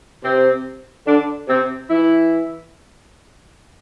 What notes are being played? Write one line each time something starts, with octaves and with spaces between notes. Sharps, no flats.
C3 C4
D3 D4
C3 C4
E3 E4